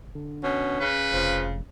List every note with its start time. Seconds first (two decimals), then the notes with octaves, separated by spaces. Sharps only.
0.15 D3
0.43 B2 C#4
0.81 C#3 B4
1.12 F1 F3